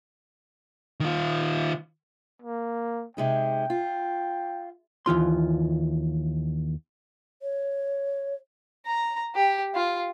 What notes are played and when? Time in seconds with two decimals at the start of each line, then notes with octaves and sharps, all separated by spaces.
1.00 D#3 F4
2.42 A#3
3.17 C3 G#3 D#4 G5
3.70 F4
5.06 D#2 E3 F4 C6
7.42 C#5
8.86 A#5
9.35 G4
9.75 F4